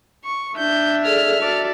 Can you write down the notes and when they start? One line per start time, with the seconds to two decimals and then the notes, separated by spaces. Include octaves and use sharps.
0.25 C#6
0.58 D4 E5 G6
1.05 G#4 A4 D5 F6
1.40 F#4 A4 D5